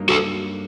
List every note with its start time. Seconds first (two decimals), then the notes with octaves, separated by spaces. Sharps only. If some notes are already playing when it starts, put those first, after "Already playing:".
Already playing: G2 F#3 A#3 D#4
0.09 F#4 A4